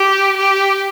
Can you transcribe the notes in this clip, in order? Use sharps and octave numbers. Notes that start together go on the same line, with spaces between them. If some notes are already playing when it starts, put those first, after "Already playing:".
Already playing: G4
G4